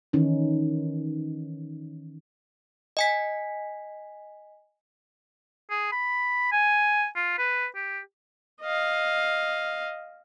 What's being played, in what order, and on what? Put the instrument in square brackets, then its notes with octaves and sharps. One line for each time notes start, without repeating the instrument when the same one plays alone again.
[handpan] D#3 E3 C#4 D#4
[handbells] D#5 G#5 B6
[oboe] G#4
B5
G#5
F4
B4
G4
[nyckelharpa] D#5 F5